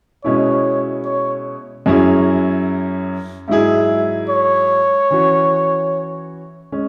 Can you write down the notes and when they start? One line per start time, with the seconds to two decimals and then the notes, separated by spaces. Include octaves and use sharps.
0.24 B2 G#3 C#4 E4 C#5
1.05 C#5
1.86 F#2 F#3 C#4 E4 G#4
3.48 G#2 F#3 E4 G#4 E5
4.29 C#5
5.11 E3 C#4 F#4
6.72 G#3 C#4